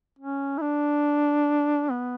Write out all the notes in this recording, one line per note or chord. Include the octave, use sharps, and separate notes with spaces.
C#4
E4
D4
B3